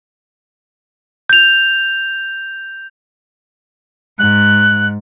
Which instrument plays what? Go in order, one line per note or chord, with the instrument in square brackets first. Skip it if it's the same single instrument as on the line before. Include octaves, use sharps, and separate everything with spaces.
[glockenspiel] G6 F7
[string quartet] G#2 [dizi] F#6